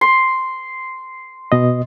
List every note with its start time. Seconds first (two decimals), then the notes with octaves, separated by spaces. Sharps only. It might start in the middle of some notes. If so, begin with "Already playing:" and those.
0.01 C6
1.52 B2 D#5